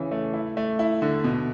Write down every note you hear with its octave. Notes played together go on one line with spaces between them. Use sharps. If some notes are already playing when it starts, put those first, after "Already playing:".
Already playing: C#3 E3 C#4
A3
E4
A3
E4
D3
B2